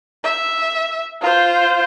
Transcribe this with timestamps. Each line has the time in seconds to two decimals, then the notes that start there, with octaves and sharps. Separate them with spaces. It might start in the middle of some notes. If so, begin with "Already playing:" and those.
0.24 E5
1.22 F4 C5